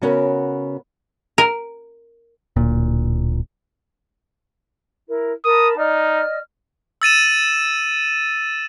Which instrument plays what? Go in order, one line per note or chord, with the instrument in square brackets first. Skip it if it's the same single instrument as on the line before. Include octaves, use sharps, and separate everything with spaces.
[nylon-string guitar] C#3 B3 C#4 F#4 A#4
[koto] A#4
[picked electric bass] D1 A#2
[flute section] E4 A#4
[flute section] A#4 A5 B5 [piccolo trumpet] D#6
[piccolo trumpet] D#4 [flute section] D5 D#5 F6
[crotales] E6 A6 D#7 E7